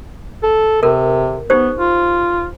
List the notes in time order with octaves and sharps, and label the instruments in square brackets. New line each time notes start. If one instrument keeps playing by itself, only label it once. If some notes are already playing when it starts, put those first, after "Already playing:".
[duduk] A4
[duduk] C3 [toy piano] A4 A#4
[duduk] B3 [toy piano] D#4 G4 C5
[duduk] F4